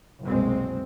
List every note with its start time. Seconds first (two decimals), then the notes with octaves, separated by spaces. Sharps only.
0.23 F#1 C2 B2 G#3 C4